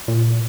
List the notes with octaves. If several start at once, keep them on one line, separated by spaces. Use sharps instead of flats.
A#2